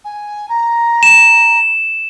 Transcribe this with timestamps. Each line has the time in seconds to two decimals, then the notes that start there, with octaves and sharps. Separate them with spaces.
0.04 G#5
0.49 A#5
1.03 E7